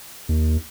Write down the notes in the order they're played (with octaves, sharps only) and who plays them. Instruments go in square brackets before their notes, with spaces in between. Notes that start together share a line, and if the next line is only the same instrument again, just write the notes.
[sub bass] D#2